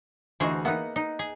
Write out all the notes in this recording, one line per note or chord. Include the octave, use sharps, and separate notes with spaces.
D2 E3 F#4 G#4 C5 D#5
A#3 B3 D#4 E5 F#5
D#4
G#4